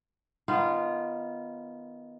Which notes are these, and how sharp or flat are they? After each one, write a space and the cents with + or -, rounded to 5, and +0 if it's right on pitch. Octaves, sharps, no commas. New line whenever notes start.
D#3 +0 B3 +0 F4 -20